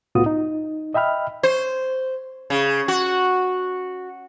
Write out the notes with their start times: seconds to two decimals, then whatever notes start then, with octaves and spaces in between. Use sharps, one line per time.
0.15 C2 A2 B3 F4 F#4 D#6
0.26 D#4
0.94 D#5 E5 G5 B5 F6
1.43 C5
2.50 C#3
2.88 F#4